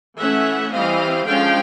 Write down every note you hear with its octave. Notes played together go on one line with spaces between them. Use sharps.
E3 A3 C#4 E5 F#5
E3 G3 C4 D#5 F5
D3 F3 G#3 C#4 F5 G5